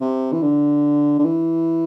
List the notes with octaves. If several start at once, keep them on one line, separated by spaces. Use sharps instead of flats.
C3
E3
D3
D3
E3